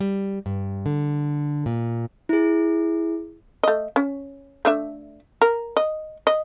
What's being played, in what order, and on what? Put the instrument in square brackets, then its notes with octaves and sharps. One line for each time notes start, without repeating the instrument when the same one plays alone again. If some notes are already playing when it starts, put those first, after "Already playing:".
[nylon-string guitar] G3
G2
D3
A#2
[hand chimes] E4 G#4
[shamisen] A3 D#5
C#4
A3 D4 E5
A#4
D#5
D#5